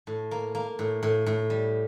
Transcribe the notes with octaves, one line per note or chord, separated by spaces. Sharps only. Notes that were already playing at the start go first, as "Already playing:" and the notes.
A2
A#3
A#3
A2
A2
A2
G3